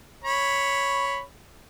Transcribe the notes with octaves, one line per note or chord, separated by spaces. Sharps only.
C#5 B5